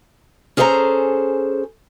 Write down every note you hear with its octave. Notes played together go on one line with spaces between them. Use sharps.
C#4 G#4 A4 C5 F5 A#5